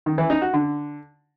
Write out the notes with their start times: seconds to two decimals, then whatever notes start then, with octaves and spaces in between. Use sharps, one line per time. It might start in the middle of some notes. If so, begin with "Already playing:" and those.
0.06 D#3
0.18 E3
0.30 D#4
0.42 F#4
0.53 D3